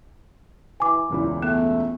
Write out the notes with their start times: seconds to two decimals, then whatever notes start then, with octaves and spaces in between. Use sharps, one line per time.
0.80 E3 G#5 D6
1.10 E1 C#2 A#2 E4
1.42 A3 B3